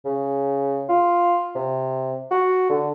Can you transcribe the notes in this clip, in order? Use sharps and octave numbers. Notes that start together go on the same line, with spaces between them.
C#3
F4
C3
F#4
D3